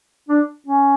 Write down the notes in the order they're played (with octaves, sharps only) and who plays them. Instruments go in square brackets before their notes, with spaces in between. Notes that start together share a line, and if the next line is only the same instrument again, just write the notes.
[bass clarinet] D4
C#4